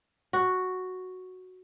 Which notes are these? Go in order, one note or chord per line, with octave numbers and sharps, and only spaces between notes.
F#4